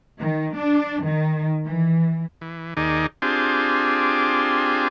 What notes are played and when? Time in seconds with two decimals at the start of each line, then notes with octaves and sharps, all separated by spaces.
0.19 D#3
0.57 D4
1.04 D#3
1.64 E3
2.41 E3
2.77 D#2 D#3 D#4 G#4 D5
3.22 C4 D4 F4 G4 G#4